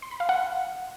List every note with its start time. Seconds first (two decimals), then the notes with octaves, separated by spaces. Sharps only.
0.02 C6
0.11 B5
0.20 F5
0.29 F#5